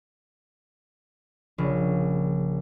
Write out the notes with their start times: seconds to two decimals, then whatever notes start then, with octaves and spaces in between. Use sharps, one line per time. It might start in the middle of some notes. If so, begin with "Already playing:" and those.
1.58 A#1 C#3